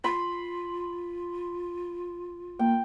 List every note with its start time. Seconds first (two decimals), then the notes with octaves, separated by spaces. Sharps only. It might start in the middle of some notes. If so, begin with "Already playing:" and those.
0.04 F4 B5 C6
2.59 A#3 G5